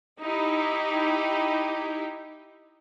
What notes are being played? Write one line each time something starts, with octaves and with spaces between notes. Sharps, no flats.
D#4 E4 G4